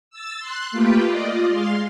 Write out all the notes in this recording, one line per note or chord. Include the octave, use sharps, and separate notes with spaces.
E6 A6
C6 F#6
A3 A#3 F4 G4 B4 G5
F4 D5 D#5
G#3 F5 C6